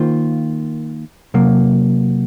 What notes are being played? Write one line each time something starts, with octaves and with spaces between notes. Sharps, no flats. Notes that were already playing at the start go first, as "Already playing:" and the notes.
Already playing: D#3 A#3 F4 C5
C3 F#3 A#3